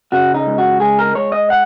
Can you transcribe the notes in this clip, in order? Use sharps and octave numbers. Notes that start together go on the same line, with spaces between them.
C#3 F#4
D#4
C#2
F#4
G#3 G#4
A#4
G#3 C#5
D#5
F#5